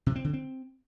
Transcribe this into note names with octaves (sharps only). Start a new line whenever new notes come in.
C3
C4
D3
C4